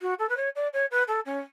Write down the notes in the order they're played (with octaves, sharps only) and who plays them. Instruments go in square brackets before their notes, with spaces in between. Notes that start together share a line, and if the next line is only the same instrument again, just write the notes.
[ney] F#4
A4
B4
C#5
D5
C#5
B4
A4
C#4